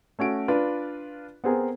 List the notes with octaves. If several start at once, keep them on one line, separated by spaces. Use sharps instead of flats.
A3 C#4 F#4 D7
D4 F4 B4
B3 C4 G#4 A#4